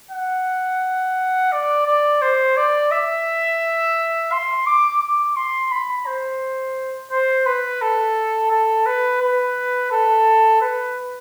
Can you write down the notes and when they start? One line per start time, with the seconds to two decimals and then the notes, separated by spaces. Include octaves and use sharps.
0.11 F#5
1.52 D5
1.86 D5
2.21 C5
2.56 D5
2.91 E5
4.32 C6
4.66 D6
5.01 D6
5.36 C6
5.71 B5
6.06 C5
7.11 C5
7.46 B4
7.81 A4
8.51 A4
8.86 B4
9.21 B4
9.91 A4
10.61 B4